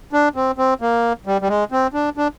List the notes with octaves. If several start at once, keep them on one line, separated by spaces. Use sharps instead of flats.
D4
C4
C4
A#3
G3
G3
G#3
C4
D4
D4